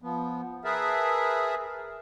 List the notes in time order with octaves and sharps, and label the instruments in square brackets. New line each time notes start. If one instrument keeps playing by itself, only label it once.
[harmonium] F3 B3
[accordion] G#4 E5 [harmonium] A#4 B4 A5